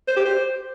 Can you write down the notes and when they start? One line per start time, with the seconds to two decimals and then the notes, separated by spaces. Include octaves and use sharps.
0.08 C5
0.16 G4
0.25 C5